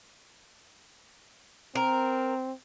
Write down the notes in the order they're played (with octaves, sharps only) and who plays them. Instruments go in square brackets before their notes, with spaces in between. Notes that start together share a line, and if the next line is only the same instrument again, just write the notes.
[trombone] C4 [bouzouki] A#4